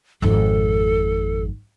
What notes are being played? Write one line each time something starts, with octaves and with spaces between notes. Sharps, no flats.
G#1 F2 A4